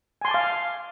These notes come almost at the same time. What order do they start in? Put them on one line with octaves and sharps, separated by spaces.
G#5 C6 A5 D6 F5